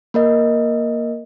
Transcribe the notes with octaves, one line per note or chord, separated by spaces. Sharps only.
A#3 A#4 D#5